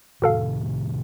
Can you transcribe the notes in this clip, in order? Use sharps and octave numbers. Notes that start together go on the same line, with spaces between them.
A2 C3 D#3 F#4 A4 F5